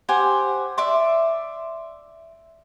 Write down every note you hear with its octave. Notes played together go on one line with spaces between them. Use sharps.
G4 C5 F#5 G#5
D5 E5 C6